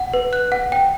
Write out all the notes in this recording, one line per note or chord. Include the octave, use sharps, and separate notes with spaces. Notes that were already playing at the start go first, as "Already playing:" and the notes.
Already playing: F#5
B4
F#6
F#5
G5